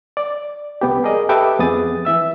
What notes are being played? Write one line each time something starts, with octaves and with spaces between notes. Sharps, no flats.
D5
C2 B3 G4
G#4 A#4 D5 D#5
G4 A4 B4 D#5 E5 D6
F2 B3 G#4 D#6 A6
E3 E5 E6